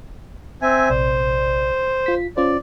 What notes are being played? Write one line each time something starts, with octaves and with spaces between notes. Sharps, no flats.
C4 E5 G#5
A#1 C3 C5 D5
F4 B6
C#4 F4 C5 D5